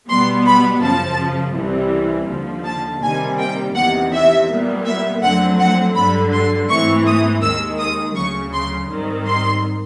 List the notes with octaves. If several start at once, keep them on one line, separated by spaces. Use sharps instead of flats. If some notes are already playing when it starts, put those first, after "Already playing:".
B2 G3 B3 C6
B5
F#2 C#3 F3 A5
C2 C3 E3 G3 C4
D#2 D3 F3
A5
C3 D#3 G3 A#3 G#5
G5
E2 C3 D#3 F#5
E5
A#2 G3 B3
E5
F2 D3 F#3 A3 C4 F#5
F#5
G2 D3 F#3 B5
C6
G#2 E3 A3 C4 C#6
D#6
D#2 D#3 G#3 E6
D#6
D2 C#3 F#3 C#6
C6
G#2 D#3 G3 C4
C6